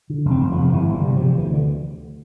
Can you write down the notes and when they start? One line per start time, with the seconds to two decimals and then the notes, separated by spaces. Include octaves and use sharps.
0.10 D3
0.25 F1
0.31 C4
0.41 F1
0.52 F3
0.57 F1
0.73 G1 E3
0.89 G1
0.94 G3
1.05 C3
1.17 C3 F3
1.37 D2 E3
1.53 D3